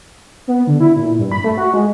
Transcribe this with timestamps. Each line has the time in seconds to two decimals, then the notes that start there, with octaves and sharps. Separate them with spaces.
0.48 B3
0.67 D3
0.81 E4
0.97 A#2
1.19 G2
1.32 B5
1.44 A3
1.57 F#4
1.74 G#3